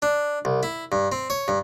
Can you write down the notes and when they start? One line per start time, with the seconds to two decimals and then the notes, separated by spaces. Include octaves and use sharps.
0.02 D4
0.45 C2
0.63 E4
0.92 G2
1.12 C4
1.30 C#5
1.48 G2